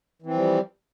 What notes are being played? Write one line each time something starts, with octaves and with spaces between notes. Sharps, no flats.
E3 F3 G3 C4